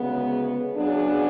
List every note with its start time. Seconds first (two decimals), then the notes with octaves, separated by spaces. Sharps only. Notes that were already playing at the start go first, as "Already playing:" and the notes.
Already playing: D2 C#3 G#3 B3
0.73 C#3 F#3 B3 D4 G#4